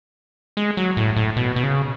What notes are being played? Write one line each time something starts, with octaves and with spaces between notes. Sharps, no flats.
G#3
F#3
A2
A2
B2
B2
C#3